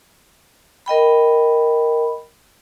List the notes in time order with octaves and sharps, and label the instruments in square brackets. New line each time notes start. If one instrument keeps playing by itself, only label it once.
[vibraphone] A#4 D#5 G5 B5